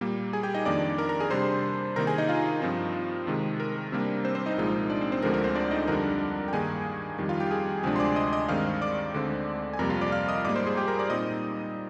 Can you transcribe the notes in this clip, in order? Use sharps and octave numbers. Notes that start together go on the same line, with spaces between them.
A#2 G3 A#3
G#4 G#5
G4 G5
D#4 D#5
F2 D#3 A#3 D4 D5 D6
A#4 A#5
A#4 A#5
G#4 G#5
C3 G3 D4 C5 C6
C3 D#3 A#3 D#4 A#4 A#5
G#4 G#5
D#4 D#5
F4 F5
G2 F3 C4 D#4
C3 D#3 G#3
A#4
C3 G3 A#3 D4
C4 C5
C4 C5
D#4 D#5
C2 A#2 F3 G#3 D#4
D4 D5
C4 C5
C4 C5
D2 D3 F3 G#3 C4 A#4
A#4
C4 C5
D4 D5
D#4 D#5
F2 D3 G3 D4 A#4 A#5
G5
G2 D#3 A#3 D#4 G#4 G#5
F2 D#3 G3
F4 F5
G4 G5
G#4 G#5
D2 C3 F3 G#3 D4 G#4 G#5
C6
D5 D6
D#5 D#6
D#5 D#6
G2 D#3 G#3 C4 D#4 F5 F6
D5 D6
D2 D3 G#3 C4
G#5
F2 C3 G3 A#3 A#4 A#5
F4 F5
D5 D6
F5 F6
D#5 D#6
G#2 G3 A#3 D5 D6
C5 C6
G#4 G#5
G4 G5
A#4 A#5
D5 D6
A#2 G3 C4 D#4 D#5 D#6